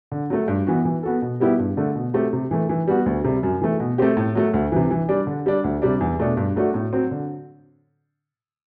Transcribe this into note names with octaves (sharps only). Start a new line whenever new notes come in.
D3
F#3 A3
G2
E3 B3 F#4
E3
B3 F#4 A4
B2
G3 B3 E4 G4
G2
D3 A3
B2
F#3 A3 C4 G4
C3
E3 A3
E3
G3 B3 F#4
D2
C3 G3
F#2
E3 A3
B2
A3 C4 G4
A2
F#3 A3
D2
C3 E3
E3
G3 D4
D3
G3 D4
D2
C3 G3 D4
E2
B2 A3 D4 A4
G2
F#3 A3 D4 F#4
A2
F#3 C4
D3